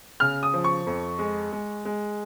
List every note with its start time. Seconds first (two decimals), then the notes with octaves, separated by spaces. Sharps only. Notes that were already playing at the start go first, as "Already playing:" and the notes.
0.20 C#3 F6
0.43 D#6
0.54 F3
0.64 C#6
0.87 F2
1.19 G#3
1.53 G#3
1.85 G#3